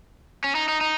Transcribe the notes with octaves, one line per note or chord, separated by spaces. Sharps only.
C#4
D#4
D#4
D#4